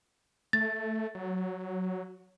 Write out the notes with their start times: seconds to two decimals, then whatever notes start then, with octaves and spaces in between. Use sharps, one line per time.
0.53 A3 A6
1.15 F#3